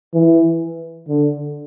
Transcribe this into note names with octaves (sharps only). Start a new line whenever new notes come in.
E3
D3